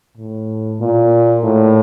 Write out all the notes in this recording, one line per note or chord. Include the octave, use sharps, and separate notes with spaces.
A2
A#2
A2